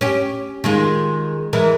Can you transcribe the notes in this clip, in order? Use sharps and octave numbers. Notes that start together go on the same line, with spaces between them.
C#4 G4
D#3 G#3 F4
E3 G#3 A#4